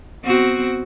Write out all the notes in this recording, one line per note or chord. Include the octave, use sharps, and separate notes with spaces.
B3 C4 F#4